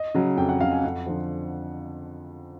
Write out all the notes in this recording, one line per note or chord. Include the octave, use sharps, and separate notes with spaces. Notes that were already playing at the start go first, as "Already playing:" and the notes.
Already playing: D#5
C#3 F#3
F2 G5
F#5
C#3 F#3 F5
G#5
F2 F#5
D3 F3